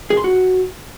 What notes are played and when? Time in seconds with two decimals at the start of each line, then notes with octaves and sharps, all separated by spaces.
0.10 G#4
0.17 C6
0.24 F#4